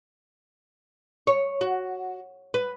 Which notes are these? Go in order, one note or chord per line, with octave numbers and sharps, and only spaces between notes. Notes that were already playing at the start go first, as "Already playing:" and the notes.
C#5
F#4
B4